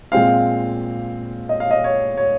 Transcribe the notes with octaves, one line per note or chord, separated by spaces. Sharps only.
A#2 G#3 C4 F5
D#5
F5
D#5
C#5
C#5